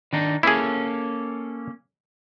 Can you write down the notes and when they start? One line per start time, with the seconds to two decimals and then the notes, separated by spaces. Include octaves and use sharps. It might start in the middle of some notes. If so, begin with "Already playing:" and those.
0.13 D#3 D4 D#4
0.43 A#3 C#4 E4 G#4 A4